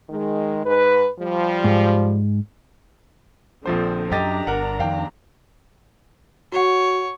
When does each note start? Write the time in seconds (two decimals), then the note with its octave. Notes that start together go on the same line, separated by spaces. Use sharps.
0.10 D#3 G#3
0.65 G#2 B4
1.20 F3 G3
1.64 G#2
3.66 A#1 D3 F3 C4 C5
4.12 F#2 D4 G4 D#5 A#5 A6
4.47 G1 A#4 F#5
4.80 F2 D#3 F5 G5
6.52 F#4 C#5 F#5